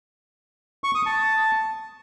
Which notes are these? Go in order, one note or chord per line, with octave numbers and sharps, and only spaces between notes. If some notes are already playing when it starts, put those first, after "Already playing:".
C#6
D#6
A5